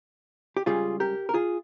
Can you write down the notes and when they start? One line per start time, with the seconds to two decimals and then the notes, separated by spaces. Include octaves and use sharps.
0.57 G4
0.66 C#2 C#3 G3 C#4 F4 G#4
1.00 G4 A#4
1.29 A#4
1.34 F4 G#4